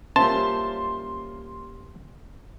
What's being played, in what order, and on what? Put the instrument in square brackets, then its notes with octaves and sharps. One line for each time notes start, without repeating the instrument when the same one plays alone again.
[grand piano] G3 A#3 F4 [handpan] C#4 C5 E5 [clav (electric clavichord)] A5 [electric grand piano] C6